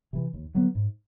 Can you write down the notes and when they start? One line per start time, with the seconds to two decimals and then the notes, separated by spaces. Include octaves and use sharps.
0.13 C3 E3
0.34 D#2
0.54 D3 F#3 B3
0.75 G#2